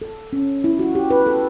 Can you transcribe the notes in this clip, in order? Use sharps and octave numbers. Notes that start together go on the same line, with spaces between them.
A4
C#4
E4
F#4
G4
B4
A4